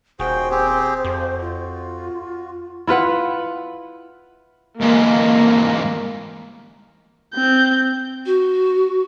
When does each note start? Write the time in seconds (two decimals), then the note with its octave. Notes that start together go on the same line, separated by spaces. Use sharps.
0.20 D#1 F#4 G#4 C5 G5
0.51 C4 G4 G#4
1.05 F2 F#4
1.41 F4
2.87 E4 F4 B4 F#5
4.81 G#2 E3 A#3
7.34 C4 G6
8.26 F#4